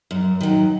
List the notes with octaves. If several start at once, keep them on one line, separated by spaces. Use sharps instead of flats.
F#2
D#3 F#3